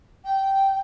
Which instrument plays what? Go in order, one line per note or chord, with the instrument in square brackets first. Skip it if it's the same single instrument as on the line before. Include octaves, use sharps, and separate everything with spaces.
[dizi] G5